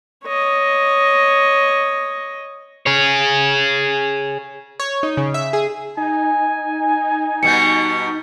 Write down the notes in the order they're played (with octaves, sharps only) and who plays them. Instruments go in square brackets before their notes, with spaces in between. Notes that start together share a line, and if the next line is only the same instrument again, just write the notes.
[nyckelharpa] C#5 D#5
[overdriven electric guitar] G#4 C#5
[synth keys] C#5
D#4
C#3
E5
G#4
[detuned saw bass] D#4 [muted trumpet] G#5
[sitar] B2 G3 B3 [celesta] G6 C#7